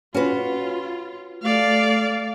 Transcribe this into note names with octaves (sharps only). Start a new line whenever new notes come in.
C#4 F4 F#4 B4
A3 D5 F5